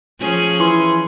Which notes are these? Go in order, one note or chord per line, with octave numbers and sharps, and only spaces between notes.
F3 C#4 G#4
E3 C6